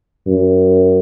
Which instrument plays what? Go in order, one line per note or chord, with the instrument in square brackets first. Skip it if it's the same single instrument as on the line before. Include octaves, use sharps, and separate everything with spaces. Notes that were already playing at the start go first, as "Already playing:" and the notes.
[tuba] F#2